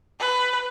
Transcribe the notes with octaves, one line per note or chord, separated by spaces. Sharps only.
B4